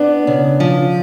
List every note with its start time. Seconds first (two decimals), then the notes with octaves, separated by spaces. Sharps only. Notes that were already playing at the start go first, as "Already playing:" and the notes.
Already playing: B3 D4
0.27 C#3
0.60 F3